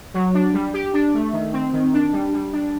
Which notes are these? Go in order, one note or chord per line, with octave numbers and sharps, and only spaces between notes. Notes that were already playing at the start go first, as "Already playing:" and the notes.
F#3
D4
G3
G4
D4
A3
D#3
C4
D#3
D4
G3
G3
D4